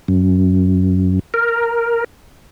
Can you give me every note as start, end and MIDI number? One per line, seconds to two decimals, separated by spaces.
0.08 1.19 42
1.34 2.04 70